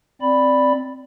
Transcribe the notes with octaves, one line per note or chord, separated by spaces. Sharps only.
C4 D5 B5